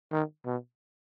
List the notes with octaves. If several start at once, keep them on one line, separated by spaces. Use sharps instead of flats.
D#3
B2